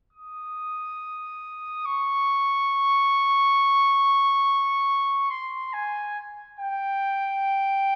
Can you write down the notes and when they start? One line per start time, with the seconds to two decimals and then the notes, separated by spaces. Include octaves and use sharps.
0.13 D#6
1.85 C#6
5.30 C6
5.73 G#5
6.59 G5